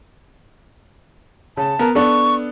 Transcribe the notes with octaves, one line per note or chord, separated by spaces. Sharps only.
C#3 A5
B3 A#4
B3 D4 A4 C#6